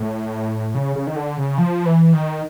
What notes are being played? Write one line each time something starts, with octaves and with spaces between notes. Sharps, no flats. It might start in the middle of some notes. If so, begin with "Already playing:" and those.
Already playing: A2
C#3
C#3
D#3
D3
C#3
F3
E3
D#3